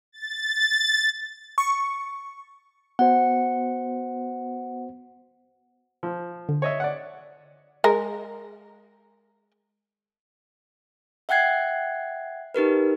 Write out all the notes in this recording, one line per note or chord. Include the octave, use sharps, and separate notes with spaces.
A6
C#6
B3 F#4 C5 F#5
F3
D3
C#5 D#5 E5
D5 F#5
G#3 A#4
E5 F#5 G5 F#6 G#6 C7
D#4 G4 A#4 B4